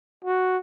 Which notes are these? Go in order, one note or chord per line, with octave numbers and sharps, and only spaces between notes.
F#4